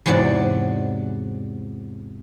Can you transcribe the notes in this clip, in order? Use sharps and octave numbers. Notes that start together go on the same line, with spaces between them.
E2 G#2 C3 F#3 F#4 D5